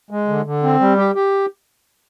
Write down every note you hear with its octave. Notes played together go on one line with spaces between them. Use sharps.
G#3
D3
D3
C4
G3
G4
G4